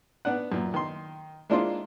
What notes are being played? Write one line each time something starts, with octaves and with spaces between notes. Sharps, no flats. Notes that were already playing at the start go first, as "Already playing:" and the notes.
B3 D4 F#5
F#2 A#2
D#3 C6
G#3 A#3 D4 E4 F4 C5